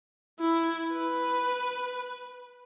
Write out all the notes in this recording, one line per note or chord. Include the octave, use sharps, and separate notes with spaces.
E4
B4